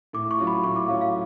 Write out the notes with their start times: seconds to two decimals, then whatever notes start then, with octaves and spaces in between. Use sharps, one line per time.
0.13 A2 D6
0.31 C#6
0.38 F#3 C#4 F4
0.47 B5
0.64 A2 C#6
0.76 D6
0.88 F#3 C#4 F4 F5
1.01 F5